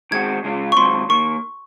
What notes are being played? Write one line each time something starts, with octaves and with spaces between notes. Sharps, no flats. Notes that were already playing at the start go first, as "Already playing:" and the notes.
D#3 G#3 C4 F#4 G#6
C#3 G#3 C#4 F4
C#6
G#2 D#3 F#3 C4 F4 C6
D#3 A#3 C#6